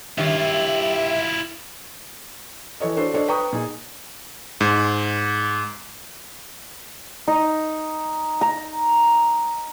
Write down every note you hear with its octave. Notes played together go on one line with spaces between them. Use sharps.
G2 D#3 E4 F4 G4 C#5 E5
E3 A4 C#5 D#5
D4 F#4 A4 C5
D4 A4 C5 C#5 D#5
B4 G5 A#5 C#6 D#6
A#2 D#4 G#4
G#2
D#4
A#5